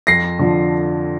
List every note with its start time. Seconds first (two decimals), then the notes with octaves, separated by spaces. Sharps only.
0.07 F2 A#6 C7
0.39 D3 F3